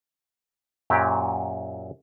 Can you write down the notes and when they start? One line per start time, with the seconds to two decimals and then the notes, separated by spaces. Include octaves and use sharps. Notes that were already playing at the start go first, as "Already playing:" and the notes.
0.90 F#2 A#2 F#3 G4